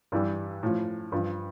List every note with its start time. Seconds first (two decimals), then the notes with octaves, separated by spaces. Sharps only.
0.12 G2 E3 G3
0.63 A2 F3
1.12 G2 F3